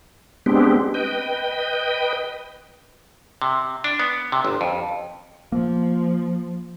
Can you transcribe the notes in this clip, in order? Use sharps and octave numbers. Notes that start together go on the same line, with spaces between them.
G#3 B3 C4 D4 G4
B4 D#5 G5
C3
D4
B3
C3
G1
F2
F3 A#3